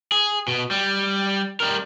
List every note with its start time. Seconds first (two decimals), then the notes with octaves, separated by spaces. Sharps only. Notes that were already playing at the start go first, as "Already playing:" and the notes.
0.12 G#4
0.48 B2
0.71 G3
1.60 G3 A#4